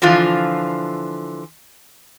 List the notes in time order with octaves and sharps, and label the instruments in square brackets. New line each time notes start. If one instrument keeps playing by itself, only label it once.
[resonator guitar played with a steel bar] D3 E3 F3 F4